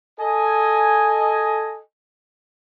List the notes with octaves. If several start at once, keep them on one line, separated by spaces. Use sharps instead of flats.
A4 D#5 G#5